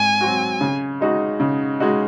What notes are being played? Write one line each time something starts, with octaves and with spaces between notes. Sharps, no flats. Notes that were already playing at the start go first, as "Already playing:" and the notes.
Already playing: G#2 C4 G#5
F#3 C4 F#4
C#3
G#3 D#4 F#4
C#3
G#3 D#4 F#4